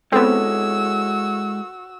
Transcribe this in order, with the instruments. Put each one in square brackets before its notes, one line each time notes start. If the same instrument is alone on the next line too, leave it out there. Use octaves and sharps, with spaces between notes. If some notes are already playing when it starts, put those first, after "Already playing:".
[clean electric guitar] G#3 E4 C#5 [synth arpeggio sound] B3 C4 [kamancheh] F#4 E6 [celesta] A4